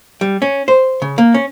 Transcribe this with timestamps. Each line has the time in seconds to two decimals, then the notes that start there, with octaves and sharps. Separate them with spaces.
0.21 G3
0.42 C#4
0.68 C5
1.02 C#3
1.18 A#3
1.34 C#4